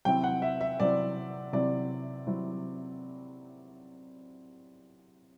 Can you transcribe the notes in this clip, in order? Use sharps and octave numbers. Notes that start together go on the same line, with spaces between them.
C3 F#3 C4 E4 G5
F#5
E5
E5
C3 F#3 C4 E4 D5
C3 F#3 C4 E4 D5
C3 F#3 C4 E4